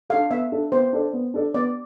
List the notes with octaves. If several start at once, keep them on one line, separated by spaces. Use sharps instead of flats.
D4 A4 F5
B3 E5
D4 A4
B3 C5
D4 A4 D5
B3
D4 A4 D5
B3 D5